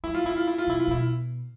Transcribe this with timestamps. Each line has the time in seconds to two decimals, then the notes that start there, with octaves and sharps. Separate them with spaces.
0.04 F3 E4
0.15 F4
0.25 F3 E4
0.37 F4
0.48 E4
0.58 F4
0.67 C3
0.70 E4
0.80 F4
0.88 B2 E4